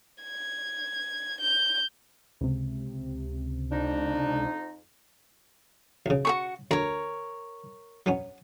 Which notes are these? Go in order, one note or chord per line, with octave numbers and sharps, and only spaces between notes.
G#6
G6
C#2 C3
F2 D4 D#4
B1 C#3
F#4 A4 C#6
D2 A#4 C#5
F#3 B3 C#4